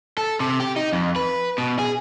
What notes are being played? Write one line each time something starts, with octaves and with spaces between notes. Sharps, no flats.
A4
C3
G4
D#4
F2
B4
B2
G#4